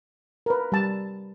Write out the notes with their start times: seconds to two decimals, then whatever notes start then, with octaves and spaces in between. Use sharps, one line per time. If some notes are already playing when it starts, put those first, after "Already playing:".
0.46 A#4 B4
0.72 G3 A5